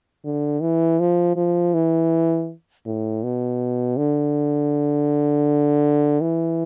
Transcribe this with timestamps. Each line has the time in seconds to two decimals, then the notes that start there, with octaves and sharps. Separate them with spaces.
0.25 D3
0.62 E3
1.00 F3
1.36 F3
1.74 E3
2.86 A2
3.23 B2
3.97 D3
6.21 E3